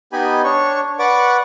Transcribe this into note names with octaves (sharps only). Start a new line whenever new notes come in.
B3 D#4 G4 D#5 G#5 B5
D4 C#5 C#6
B4 D5 F#5 C#6 D6